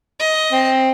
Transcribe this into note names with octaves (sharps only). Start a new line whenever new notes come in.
D#5
C4